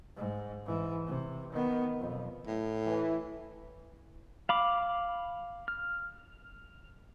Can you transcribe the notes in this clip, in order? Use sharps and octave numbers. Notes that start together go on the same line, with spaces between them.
G#2
G#2 E3
C3
D#3 B3
B1 F2
A2
E3
F5 B5 D6
F6